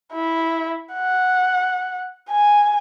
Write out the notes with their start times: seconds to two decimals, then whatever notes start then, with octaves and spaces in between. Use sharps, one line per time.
0.13 E4
0.94 F#5
2.30 G#5